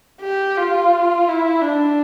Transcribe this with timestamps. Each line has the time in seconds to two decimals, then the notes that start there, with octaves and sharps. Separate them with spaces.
0.21 G4
0.57 F4
1.28 E4
1.62 D4